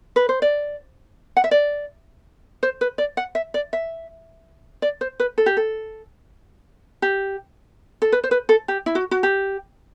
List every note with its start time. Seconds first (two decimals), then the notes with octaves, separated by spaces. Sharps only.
0.16 B4
0.29 C5
0.42 D5
1.37 F#5
1.44 E5
1.51 D5
2.63 C5
2.81 B4
2.98 D5
3.17 F#5
3.35 E5
3.54 D5
3.73 E5
4.82 D5
5.01 C5
5.20 B4
5.38 A4
5.46 G4
5.57 A4
7.02 G4
8.02 A4
8.12 B4
8.24 C5
8.31 B4
8.49 A4
8.68 G4
8.86 E4
8.95 F#4
9.11 F#4
9.23 G4